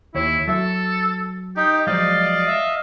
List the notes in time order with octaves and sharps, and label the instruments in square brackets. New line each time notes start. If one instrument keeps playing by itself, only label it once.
[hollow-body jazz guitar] D#2 C#5 [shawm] E4
[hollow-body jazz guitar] F#3 E5 [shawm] A4
[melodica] D#4 [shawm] G4
[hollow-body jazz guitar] F3 F#3 G#3 [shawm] D5 [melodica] D#5 F5
[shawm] E5